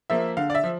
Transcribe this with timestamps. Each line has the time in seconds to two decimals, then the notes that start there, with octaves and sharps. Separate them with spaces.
0.10 F3 A#3 E5
0.37 D3 F5
0.50 D5
0.55 E5
0.64 F3